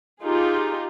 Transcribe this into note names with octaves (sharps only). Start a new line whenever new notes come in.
D#4 F4 G4 G#4